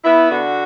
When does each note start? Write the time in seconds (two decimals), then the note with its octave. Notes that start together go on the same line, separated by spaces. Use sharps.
0.04 B3 E4
0.30 D3 F#4